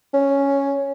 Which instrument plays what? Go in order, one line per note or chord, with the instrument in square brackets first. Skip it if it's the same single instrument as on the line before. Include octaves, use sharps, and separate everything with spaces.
[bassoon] C#4